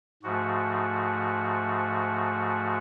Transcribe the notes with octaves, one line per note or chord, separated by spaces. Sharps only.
G#2 F3 A3 F#4